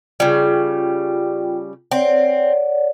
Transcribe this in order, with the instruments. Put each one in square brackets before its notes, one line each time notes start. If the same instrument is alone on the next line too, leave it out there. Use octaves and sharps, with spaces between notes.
[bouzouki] C#3 G3 [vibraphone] F4 G5
[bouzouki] C4 [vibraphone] C#5 D5 F#5